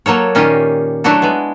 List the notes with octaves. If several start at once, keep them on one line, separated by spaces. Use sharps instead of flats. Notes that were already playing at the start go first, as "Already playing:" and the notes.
F#3 A#3 A4 C#5
A#2 D#3 C#4 F4 G4 D#5
F#3 A3 D4 E4 F#4 A4
G#3 B3